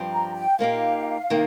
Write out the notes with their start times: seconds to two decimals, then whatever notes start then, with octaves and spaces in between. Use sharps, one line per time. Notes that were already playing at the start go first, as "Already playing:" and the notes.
Already playing: G2 F3 C4 G4
0.12 A#5
0.35 G5
0.59 A#2 A#3 D#4 G4 F5
1.30 C3 D#3 A#3